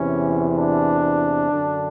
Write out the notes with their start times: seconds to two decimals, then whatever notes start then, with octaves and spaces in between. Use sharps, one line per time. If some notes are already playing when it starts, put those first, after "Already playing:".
Already playing: E2 C3 E3 C#4
0.57 D4
1.50 F#2 D3